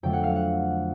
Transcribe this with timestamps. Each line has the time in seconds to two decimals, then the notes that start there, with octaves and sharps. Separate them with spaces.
0.03 F2 D3 F#3 A3 G5
0.13 F#5
0.24 F5
0.35 F#5